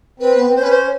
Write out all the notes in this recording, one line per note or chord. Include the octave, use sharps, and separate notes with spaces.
C4 B4
B3
C4
C#4 C5
B4
C5